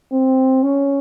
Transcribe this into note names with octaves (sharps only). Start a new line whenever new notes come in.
C4
C#4